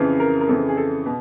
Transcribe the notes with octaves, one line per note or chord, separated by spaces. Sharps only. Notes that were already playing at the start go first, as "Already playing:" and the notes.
Already playing: F2 C#3 E3
A#4
A#4
F2 C#3 E3 A4
G#4
A4
B2